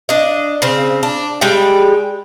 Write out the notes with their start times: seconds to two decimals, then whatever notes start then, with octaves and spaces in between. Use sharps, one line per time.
0.09 D4 D#5
0.62 C#3 C4
1.03 D4
1.41 G3 G#3 D5 G5